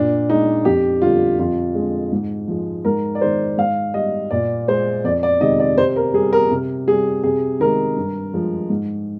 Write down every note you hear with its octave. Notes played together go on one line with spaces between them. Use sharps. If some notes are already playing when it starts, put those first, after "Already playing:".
Already playing: A#2 D4
G#3 D#4
F2 G4
D3 G3 F4
F2 F4
D3 G#3
G#2
F3 G#3
G#2 A#4
D5
D#3 G#3 C5
G#2 F5
G3 D#5
A#2 D5
G#3 C5
F2 D5
D5
C3 D#3 G#3 D#5
D5
C3 C5
A#4
G3 G#4
A#4
C3
G3 G#4
C3 G#4
D#3 G#3 A#4
G2
F3 G#3
G#2